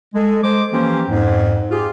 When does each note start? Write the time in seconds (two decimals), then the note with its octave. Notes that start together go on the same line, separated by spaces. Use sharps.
0.14 G#3 A4
0.43 G#3 C5 D6
0.72 E3 F3 A#3 C#4 G4 C5
1.09 F2 G#2
1.71 F4 G4 G#4